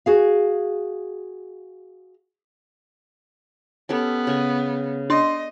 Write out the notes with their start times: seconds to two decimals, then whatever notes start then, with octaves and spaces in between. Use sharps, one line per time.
0.06 F#4 G#4 F5
3.89 B3 C#4 G4 A4
4.27 C#3 G#5
5.10 D4 D5 D#5 C6